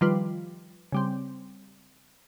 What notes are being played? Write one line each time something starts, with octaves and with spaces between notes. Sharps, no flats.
D#3 F3 G3 F4 B4
C#3 G3 C4